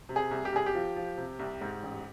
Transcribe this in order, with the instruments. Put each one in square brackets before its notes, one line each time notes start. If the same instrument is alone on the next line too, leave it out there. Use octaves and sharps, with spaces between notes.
[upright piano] C3
G#4
C2
G4
C2 G#4
G4
F3
F3
C3
C2
G#2
A1